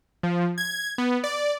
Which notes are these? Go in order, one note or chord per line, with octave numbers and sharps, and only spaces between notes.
F3
G#6
B3
D5